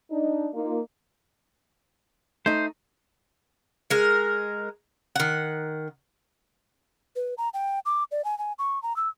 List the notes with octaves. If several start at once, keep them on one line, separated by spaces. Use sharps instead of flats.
D4 D#4
A#3 D#4 F4
A3 D#4 C5
G#3 A#4
D#3 F#5
B4
A#5
G5
D6
D5
G#5
G#5
C#6
A#5
E6